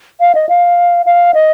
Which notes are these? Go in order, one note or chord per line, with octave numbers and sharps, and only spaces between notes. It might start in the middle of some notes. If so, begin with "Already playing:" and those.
F5
D#5
F5
F5
D#5